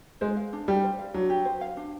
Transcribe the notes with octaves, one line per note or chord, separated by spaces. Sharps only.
G#3 C5
F5
D4
G3 G4
C5
F5
F#3 D4
G4
C5
F5
D4